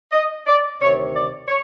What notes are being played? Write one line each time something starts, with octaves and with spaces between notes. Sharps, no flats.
D#5
D5
D2 C3 D#3 C#5
D5
C#5